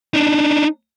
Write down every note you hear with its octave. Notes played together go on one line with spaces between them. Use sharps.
D4 D#4